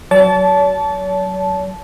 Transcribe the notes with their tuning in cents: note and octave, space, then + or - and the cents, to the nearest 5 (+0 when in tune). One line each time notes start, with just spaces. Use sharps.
F#3 +10 C#5 +45 A5 -15